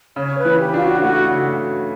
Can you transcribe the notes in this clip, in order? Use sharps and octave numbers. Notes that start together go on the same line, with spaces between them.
C#3 C#5
B4
E3
G4
D4 F4
F#4
A3 F#4
C#3